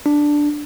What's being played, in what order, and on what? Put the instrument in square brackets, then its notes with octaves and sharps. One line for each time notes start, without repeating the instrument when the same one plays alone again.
[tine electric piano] D4